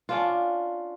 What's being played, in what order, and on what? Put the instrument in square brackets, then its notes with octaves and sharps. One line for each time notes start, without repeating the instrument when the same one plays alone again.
[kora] C#4 D4 F4